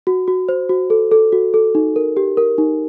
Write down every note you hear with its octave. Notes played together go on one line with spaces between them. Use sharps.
F#4
F#4
C5
F#4
A4
A4
F#4
A4
D#4
A#4
G4
A#4
D#4